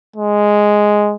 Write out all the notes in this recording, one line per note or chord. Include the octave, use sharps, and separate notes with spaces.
G#3